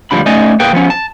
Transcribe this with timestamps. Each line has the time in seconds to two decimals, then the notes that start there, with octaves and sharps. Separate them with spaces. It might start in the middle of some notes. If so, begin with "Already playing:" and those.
0.11 D2 B2 F3 G3 D4 B5
0.26 A3 C#4 D#4 D5 D#5 G#5
0.60 A#3 G#4 B4 G5
0.73 F3 B3 C#4
0.90 A5